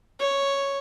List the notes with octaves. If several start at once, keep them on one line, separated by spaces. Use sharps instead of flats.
C#5